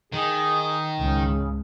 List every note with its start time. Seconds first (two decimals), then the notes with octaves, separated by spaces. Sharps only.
0.13 D#3 G#4
0.97 C#2 G#2 C#3